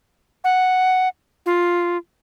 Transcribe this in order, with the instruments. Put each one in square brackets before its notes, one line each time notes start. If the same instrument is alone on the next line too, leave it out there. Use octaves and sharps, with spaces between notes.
[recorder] F#5
F4